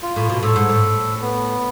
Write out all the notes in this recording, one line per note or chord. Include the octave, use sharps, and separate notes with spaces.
F4
A2
B2
A2 A4
G#2
A2
B3